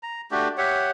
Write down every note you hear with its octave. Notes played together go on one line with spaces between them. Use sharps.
A#5
A3 D4 F#4 G4
G4 C#5 E5 F#5